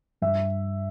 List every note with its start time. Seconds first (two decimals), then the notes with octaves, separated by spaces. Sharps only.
0.22 G2 E5